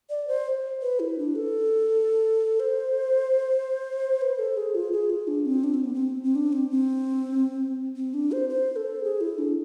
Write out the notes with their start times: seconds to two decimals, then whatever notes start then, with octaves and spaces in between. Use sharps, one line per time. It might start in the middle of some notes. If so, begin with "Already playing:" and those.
0.10 D5
0.28 C5
0.82 B4
1.00 E4
1.18 D4
1.35 A4
2.60 C5
4.21 B4
4.39 A4
4.57 G#4
4.75 F4
4.92 G#4
5.10 F4
5.28 D4
5.46 C4
5.64 D4
5.74 C4
5.84 B3
5.94 C4
6.23 C4
6.35 D4
6.53 C4
6.71 C4
7.96 C4
8.14 D4
8.32 C5
8.49 C5
8.76 A4
9.04 G#4
9.21 E4
9.38 D4